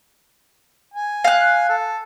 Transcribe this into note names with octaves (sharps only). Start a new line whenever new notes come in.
G#5
F5 F#6
A4